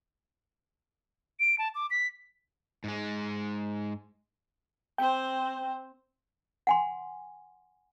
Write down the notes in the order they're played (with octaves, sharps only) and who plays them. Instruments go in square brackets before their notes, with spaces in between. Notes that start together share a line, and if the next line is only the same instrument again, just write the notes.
[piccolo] D7
A5
D6
B6
[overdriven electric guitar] G#2 G#3
[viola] C4 C5 [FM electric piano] G5
[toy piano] F#5 G#5 C6